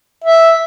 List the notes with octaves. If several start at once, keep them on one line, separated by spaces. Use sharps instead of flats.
E5